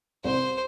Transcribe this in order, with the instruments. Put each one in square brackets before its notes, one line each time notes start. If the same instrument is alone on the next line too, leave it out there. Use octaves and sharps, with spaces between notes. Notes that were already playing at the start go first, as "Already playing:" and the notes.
[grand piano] C2 [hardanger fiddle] C5